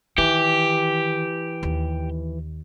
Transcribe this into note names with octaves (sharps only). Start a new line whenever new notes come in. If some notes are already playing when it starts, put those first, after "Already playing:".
D#3 E3 G4
D#2